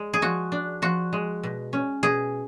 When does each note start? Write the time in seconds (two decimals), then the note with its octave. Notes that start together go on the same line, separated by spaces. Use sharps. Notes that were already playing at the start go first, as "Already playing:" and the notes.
Already playing: G#3
0.14 G#4
0.22 F3 F#4
0.52 D4
0.82 F3 F#4
1.13 G#3
1.43 B2
1.73 C#4
2.03 B2 G#4